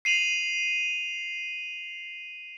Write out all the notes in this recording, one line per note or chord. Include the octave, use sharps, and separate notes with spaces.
C7 D#7 F7 F#7